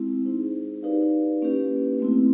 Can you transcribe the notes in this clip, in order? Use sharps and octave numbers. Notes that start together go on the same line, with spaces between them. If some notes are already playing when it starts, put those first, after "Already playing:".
Already playing: G#3 C4 E4
D#4 G#4 C5
D#4 G4 B4 D5 F5
A#3 C#4 E4 G4 B4
A3 C4 E4